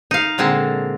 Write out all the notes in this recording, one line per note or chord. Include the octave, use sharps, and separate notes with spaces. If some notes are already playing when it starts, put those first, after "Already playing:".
D#4 F5
A#2 D3 G#3 C4 A5